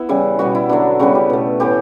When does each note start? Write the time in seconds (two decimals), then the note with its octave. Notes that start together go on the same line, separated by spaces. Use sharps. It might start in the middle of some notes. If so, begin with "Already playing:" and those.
Already playing: B3 E4
0.09 C#3 E3 G3
0.39 B2 G3 B3 F#4
0.55 E4
0.69 D3 F#3 B3 D4
0.99 C#3 G3 B3 F#4
1.15 G4
1.29 B2 A3
1.60 A2 E3 B3 G4